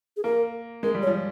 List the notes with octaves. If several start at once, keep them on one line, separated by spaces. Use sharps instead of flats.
G#4
A#3 A#4
G#3 A#4
G3
C#5
F3